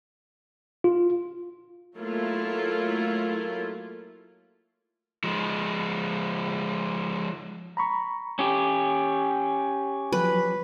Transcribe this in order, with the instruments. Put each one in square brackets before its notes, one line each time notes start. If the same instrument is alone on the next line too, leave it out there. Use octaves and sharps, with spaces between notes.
[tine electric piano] F4
[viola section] F#3 A3 A#3 E4 F4
[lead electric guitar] F3 G#3
[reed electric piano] A#5 B5 C#6
[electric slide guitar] C#4 G4
[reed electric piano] F3 F#3 [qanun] B4